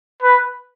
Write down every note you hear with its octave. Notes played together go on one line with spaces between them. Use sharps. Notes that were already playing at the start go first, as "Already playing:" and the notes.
B4